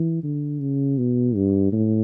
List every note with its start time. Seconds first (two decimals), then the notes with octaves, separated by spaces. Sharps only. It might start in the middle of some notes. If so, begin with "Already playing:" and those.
Already playing: E3
0.24 D3
0.61 C#3
0.98 B2
1.36 G2
1.73 A2